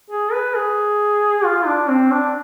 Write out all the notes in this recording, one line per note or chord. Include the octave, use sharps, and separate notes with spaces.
G#4
B4
G#4
F4
D4
C4
D4